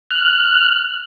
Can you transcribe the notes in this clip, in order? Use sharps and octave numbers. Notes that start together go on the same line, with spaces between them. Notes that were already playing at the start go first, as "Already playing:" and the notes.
F6 F#6